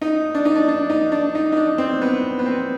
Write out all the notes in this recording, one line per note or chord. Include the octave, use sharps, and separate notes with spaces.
D#4
D4
D#4
D4
D4
D#4
D4
D#4
D#4
D4
C4
B3
B3
C4